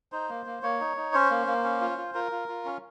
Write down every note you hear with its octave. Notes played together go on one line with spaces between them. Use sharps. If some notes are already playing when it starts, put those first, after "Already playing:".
D#4 C5
A#3
A#3
A#3 C#5
D#4
D#4
C#4 C5
A#3
A#3
C#4
F4
F4
F4 A#4
F4
F4
C#4